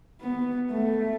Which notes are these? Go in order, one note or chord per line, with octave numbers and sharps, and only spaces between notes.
B3
A3